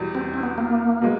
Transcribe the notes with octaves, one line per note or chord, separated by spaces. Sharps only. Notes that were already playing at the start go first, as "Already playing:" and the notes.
Already playing: E2 B2 G3
C4
C4
B3
A#3
B2 G#3